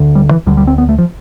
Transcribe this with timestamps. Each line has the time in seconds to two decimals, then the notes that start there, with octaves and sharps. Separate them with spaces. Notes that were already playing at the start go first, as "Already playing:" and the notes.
Already playing: D2 D3
0.15 G3
0.31 E3
0.46 D2 D3 G3
0.57 G3
0.67 C4
0.78 B3
0.89 A3
0.98 F3